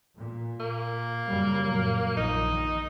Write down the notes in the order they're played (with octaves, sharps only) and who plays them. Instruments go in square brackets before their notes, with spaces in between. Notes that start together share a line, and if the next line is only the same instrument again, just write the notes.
[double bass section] A#2
[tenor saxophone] A#3
[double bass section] F#2 C#3 G3
A#2 F#3
[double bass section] A#1 [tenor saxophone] D#4
[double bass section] D#3